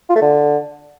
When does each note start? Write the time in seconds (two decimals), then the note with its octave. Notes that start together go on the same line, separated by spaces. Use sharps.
0.09 F4
0.16 A3
0.22 D3